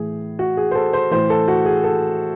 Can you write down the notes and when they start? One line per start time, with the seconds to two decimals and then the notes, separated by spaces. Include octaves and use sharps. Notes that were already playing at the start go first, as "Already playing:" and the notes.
Already playing: A2 E3 G#4
0.39 F#4
0.57 G#4
0.71 C5
0.75 A4
0.93 C5
1.11 A2 E3 C5
1.30 A4
1.48 F#4
1.65 G#4
1.84 A4